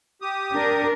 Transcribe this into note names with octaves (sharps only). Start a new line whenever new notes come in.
G4 D#6
D4 A#4